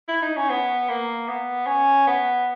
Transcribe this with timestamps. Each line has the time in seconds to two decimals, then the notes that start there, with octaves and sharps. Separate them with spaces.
0.09 E4
0.22 D#4
0.36 C#4
0.50 B3
0.89 A#3
1.28 B3
1.67 C#4
2.07 B3